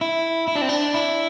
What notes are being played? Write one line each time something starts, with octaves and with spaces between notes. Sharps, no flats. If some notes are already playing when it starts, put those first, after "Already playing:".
E4
E4
D4
C4
D4
E4